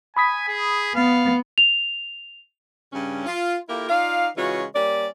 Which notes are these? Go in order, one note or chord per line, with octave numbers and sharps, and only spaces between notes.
G#5 B5 D#6 B6
G#4
B3 F5
F7
G2 C#3 G3 C#4
F4
A#3 E4 F4 G4 A4 A#4
D#4 F4 D5 F5
C#3 E3 G#3 F4 F#4 C#5
G3 A#3 C#4 D5